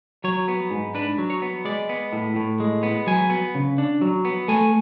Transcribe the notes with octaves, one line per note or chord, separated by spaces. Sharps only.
F#3 C#5
B3
G#2
D4 B4
F#3
C#5
B3
G#3 D5
B3
A2
A2
G#3
B3
F#3 G#5
B3
C#3
D4
F#3
B3
A3 G#5